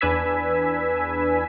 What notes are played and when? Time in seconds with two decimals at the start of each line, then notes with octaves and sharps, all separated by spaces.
0.01 E2 D4 B4 G#5 E6 B6